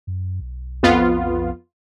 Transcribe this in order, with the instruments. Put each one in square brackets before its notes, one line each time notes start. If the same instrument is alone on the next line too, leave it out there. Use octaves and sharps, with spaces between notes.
[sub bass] F#2
B1
[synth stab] F2 B3 F4